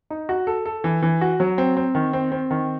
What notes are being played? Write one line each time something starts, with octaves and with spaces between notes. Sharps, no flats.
D#4
F#4
A4
A4
E3
E3
F#4
F#3
C4
C4
D#3
C4
C4
D#3